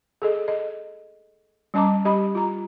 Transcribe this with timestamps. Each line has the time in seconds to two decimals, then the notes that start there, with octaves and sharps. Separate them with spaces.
0.22 G#4 A4 D#5
0.48 D#5
1.74 G3 C#4 D#5 A5 A#5 D6
2.05 G3 G4 D#5 B5
2.35 F4 A#5